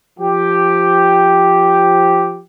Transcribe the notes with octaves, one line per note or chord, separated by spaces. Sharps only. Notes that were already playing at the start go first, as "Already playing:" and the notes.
F3 G4